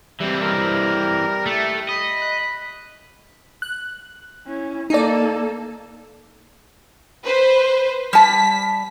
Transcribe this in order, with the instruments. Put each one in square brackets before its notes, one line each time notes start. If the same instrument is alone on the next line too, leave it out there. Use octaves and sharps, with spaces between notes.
[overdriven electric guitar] E3 C4 [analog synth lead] G3
[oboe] A#4
[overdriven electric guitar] A3 [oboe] A4
[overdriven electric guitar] D#5 [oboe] B5
[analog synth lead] F#6
[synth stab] F#6
[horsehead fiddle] C#4 E4
[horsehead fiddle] A#3 A4 [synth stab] D#4 D5
[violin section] B4 C5
[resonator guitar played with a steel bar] G3 A5 [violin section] B6